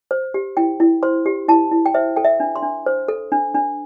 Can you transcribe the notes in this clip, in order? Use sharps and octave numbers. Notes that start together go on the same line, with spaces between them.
C5
G4
E4 G5
E4
C5 C6
G4
E4 A5
E4
G5
C5 E5
A4 G5
E5
D4
C6
D4
C5
A4
D4
D4